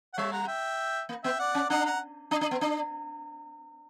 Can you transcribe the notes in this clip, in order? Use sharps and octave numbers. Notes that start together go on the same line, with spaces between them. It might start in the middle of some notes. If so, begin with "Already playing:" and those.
F#5
G3 C#5 E5
F#5 A#5
F#5
E5 G5
A#3
B3 E5 G5
D5 F#5
C#4
D4 F#5 A#5
F#5 A#5
D4
D4
B3
D4